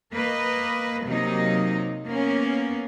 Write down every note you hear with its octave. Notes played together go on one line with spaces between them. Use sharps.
A#3 B4 D#5
C3 F#3 A#3 D#4
A#3 B3 C#4